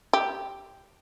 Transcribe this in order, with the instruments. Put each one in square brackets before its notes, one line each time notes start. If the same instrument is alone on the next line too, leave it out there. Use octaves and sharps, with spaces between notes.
[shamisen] G4